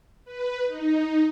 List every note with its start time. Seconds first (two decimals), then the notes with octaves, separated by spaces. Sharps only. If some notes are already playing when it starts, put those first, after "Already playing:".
0.25 B4
0.66 D#4